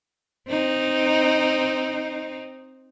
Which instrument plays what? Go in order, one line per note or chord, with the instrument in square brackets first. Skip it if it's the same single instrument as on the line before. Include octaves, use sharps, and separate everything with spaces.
[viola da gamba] C4 D#4